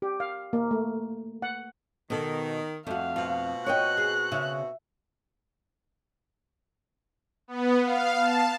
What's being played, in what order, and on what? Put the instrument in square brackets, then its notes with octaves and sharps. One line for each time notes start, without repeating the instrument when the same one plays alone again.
[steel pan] G4
F5
A#3
A3
F#5
[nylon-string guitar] B2 A4 [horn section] D#3
[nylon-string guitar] F2 [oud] A3 F#4 [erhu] F5
[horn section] B2 C4 F#4 [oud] F4
[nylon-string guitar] C#5 D#5 G5 [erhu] F#6
[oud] G#4
[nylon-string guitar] C#3 [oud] E5
[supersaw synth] B3
F5
A5